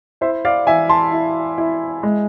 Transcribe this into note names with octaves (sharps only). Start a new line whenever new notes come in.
E4 C5 E5
D5 F5
E3 E5 G#5
A5 C6
E4
E4
G#3